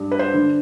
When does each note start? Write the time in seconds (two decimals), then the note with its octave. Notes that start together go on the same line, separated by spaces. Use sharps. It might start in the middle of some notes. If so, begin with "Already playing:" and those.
Already playing: G2
0.12 B4
0.19 C5
0.34 D3